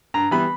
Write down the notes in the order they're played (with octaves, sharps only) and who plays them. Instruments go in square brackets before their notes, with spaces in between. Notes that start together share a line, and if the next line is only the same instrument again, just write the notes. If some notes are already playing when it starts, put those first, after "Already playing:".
[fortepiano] G2 A#5
E3 G3 B3 B5